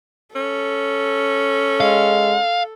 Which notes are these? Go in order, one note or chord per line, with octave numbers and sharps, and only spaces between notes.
C#4 A4
G#3 F5